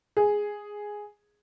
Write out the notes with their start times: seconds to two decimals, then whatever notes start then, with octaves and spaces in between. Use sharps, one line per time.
0.17 G#4